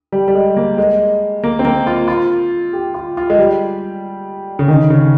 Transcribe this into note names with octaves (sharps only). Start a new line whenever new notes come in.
G3
G3
G#3
A#3
G#3
A#3
C4
A#3
F4
F4
G4
F4
F4
G#3
G3
C#3
D#3
C#3